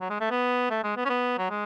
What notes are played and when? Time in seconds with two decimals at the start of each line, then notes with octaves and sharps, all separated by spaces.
0.01 F#3
0.10 G#3
0.21 A3
0.31 B3
0.70 A3
0.84 G#3
0.97 B3
1.05 C#4
1.09 B3
1.38 F#3
1.50 G#3